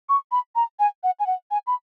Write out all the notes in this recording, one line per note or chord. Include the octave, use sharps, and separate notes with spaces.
C#6
B5
A#5
G#5
F#5
G#5
F#5
G#5
B5